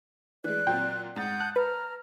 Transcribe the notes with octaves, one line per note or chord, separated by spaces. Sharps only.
E3 G#3 D5 F#6
A#2 F#3 C4 G5
G#2 F#5 D#6 G6 A6
A5 F#6
B4 A#5 F6